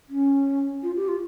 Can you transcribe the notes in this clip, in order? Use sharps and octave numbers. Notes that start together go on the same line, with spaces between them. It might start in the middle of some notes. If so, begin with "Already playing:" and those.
C#4
F4
G4
F4